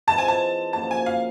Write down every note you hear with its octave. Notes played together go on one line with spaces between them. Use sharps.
E3 G#3 C4 F4 A5
G#5
A5
F#2 D3 F3 A#3 A5
G#5
F5